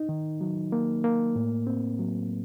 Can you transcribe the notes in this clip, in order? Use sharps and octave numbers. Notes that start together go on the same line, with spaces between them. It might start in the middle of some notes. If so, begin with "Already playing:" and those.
Already playing: D#4
D#3
F#3
A#3
A#3
A2
C4
F#3